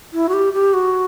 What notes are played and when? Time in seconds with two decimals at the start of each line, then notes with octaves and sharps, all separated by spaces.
0.13 E4
0.29 F#4
0.34 G4
0.53 G4
0.74 F#4